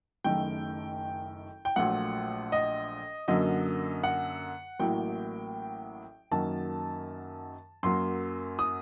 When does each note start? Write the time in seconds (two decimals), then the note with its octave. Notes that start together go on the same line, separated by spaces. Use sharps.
0.24 F#1 F#2 D#3 A3 G5
1.65 G5
1.76 A#1 A#2 F#3 A3 F#5
2.52 D#5
3.28 F#2 D3 F#3 A#3 D#5
4.04 F#5
4.79 A1 A2 F#3 A#3 G5
6.31 F#2 D#3 F#3 A#3 A5
7.83 F#2 F#3 A#3 C6
8.59 D#6